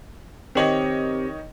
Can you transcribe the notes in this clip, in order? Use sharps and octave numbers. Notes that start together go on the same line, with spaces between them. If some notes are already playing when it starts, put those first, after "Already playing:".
D#3 C4 G4 C#5 D#5